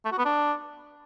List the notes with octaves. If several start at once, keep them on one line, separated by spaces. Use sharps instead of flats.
A3
F#4
B3
D4